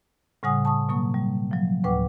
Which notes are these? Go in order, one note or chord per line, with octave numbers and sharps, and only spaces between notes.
A2 C#3 G3 F#5 G#5 D#6
A5 C#6 D#6
B2 F#3 A#3 C#6
G3
F3 F#3
D2 A2 B4 F#5 G5 D6